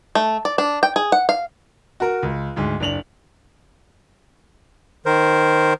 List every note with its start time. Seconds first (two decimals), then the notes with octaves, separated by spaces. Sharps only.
0.15 A3
0.45 D5
0.58 D4
0.83 G5
0.96 G#4
1.12 F#5
1.29 F5
2.00 F#4 A#4
2.23 C#2
2.56 D2 G#2
2.80 F#1 D4 F7 F#7
5.06 D#3 A#4 C5